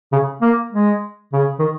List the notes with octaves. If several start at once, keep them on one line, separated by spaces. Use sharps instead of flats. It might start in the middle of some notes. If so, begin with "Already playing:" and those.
C#3
A#3
G#3
C#3
D#3